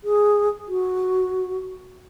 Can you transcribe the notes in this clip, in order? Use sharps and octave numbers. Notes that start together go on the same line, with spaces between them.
G#4
F#4